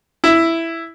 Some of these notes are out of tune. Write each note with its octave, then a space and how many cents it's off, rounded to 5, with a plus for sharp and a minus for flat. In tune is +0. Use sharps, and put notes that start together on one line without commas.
E4 +5